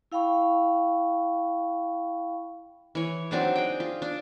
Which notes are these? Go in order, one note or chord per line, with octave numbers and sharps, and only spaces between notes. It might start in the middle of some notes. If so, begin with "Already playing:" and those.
E4 F5 G5 B5 C#6
E3 C#5
F#3 C4 D4 D#4
G#4 G5
F4
D4